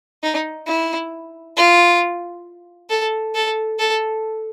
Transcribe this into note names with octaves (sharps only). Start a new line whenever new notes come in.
D#4
E4
F4
A4
A4
A4